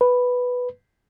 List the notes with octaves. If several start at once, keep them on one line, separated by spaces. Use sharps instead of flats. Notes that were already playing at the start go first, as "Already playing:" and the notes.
B4